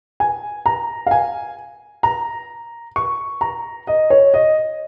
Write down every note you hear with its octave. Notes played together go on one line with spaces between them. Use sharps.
G#5
A#5
F5
G#5
A#5
C#6
A#5
D#5
C#5
D#5